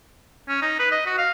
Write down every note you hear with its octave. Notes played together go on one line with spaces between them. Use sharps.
C#4
D#4
B4
D#5
F#4
F5